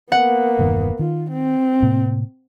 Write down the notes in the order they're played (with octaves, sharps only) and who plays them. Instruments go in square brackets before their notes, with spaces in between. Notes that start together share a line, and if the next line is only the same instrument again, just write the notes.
[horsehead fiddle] A#3 B3 [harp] F#5
[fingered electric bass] E1 G2 D#3
[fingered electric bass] D#3 [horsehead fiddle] F4
[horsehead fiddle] C4
[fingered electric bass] A2 C3 A#3